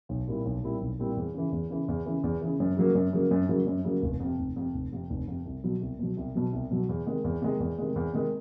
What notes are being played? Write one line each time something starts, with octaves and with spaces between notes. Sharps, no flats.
B1
A#2 G3 C4 E4
B1
A#2 G3 C4 E4
B1
A#2 G3 C4 E4
E2
C#3 E3
E2
C#3 E3
E2
C#3 E3
E2
C#3 E3
F#2
C#3 F#3 A#3
F#2
C#3 F#3 A#3
F#2
C#3 F#3 A#3
F#2
C#3 F#3 A#3
F1
F2 C3
F1
F2 C3
F1
F2 C3
F1
F2 C3
C2
B2 F#3
C2
B2 F#3
C2
B2 F#3
C2
B2 F#3
E2
C3 D#3 G#3
E2
C3 D#3 G#3
E2
C3 D#3 G#3
E2
C3 D#3 G#3